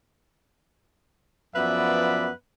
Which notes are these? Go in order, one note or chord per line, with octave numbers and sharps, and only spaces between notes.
F#2 F3 B3 B4 D5 E5